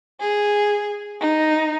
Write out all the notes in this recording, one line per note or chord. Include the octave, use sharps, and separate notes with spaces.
G#4
D#4